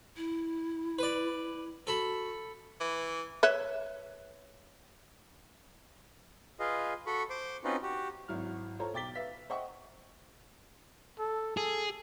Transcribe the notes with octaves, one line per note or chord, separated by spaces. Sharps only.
E4
B4 D5
F#4 A4 B5
E3
B4 C#5 E5
F4 G#4 B4 D#5 F5
F#4 A4 B5 C#6
C5 C6 D6
C4 C#4 D#4 F4 F#4 B4
F#4 G4
G#1 F#3 E4 F6
F4 A4 C5 C#5 A#5
B1 G5 D6 A6 B6 G7
B4 E5 F5 B6
C5 D#5 E5 F#5 G5 C#6
A4
G#4 A4